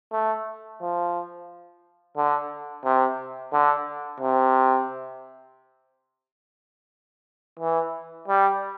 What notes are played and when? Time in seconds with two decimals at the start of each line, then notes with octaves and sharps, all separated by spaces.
0.12 A3
0.81 F3
2.17 D3
2.85 C3
3.53 D3
4.20 C3
7.59 E3
8.28 G3